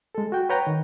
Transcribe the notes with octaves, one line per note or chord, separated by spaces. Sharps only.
G#3 A4
F#4 G5
B4 C#5 F#5 G5 A#5
D#3